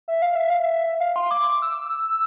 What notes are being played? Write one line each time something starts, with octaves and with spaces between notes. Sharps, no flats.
E5
F5
E5
F5
E5
F5
C6
D6
E6